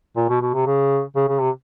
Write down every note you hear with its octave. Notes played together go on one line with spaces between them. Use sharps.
A#2
B2
B2
C3
C#3
C#3
C#3
C3